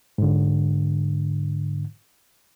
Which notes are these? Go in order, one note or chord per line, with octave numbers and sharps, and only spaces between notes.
G#2 D3